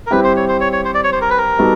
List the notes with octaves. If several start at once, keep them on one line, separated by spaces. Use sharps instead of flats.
A#4
G3 C4 E4 G4 B4
C5
C#5
C5
C#5
C#5
C5
D5
C#5
C5
A#4
B4
A#4
G3 B3 D#4 F#4 A4